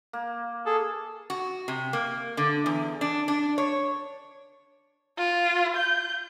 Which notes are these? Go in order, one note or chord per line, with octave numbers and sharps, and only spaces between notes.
A#3
G#4 A4
F#4
C3
A#3
D3
E2
D4
D4
C#5
F4
G6